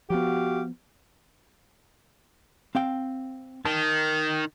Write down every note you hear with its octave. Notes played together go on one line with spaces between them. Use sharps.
F3 B3 F#4 G4 F5
C4 F5 G5
D#3 A5